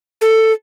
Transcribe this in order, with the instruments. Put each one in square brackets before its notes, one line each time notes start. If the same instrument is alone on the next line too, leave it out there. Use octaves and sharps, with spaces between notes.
[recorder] A4